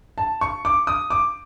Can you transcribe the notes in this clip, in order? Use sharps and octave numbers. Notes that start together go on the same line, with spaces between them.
A5
C#6
D6
D#6
D6